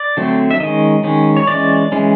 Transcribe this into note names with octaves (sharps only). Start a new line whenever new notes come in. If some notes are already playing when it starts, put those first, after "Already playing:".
Already playing: D5
D3 F#3 A3 C4
E5
D#3 G#3 C#4 D#5
D#3 G#3 C#4
C#5
E3 G#3 C#4 D5
E3 G#3 C#4